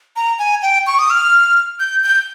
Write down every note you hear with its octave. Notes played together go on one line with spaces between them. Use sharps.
A#5
G#5
G5
C#6
D#6
F6
G6
G6